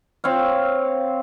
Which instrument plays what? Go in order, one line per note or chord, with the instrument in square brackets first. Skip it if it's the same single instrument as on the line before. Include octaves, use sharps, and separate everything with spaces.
[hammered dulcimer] C4 C#5 F5